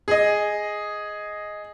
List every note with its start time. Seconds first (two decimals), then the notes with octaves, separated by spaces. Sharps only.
0.08 G#4 D#5